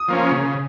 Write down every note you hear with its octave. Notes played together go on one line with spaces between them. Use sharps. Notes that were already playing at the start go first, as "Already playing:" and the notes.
Already playing: D#6
F3 A#3 C#4
C#3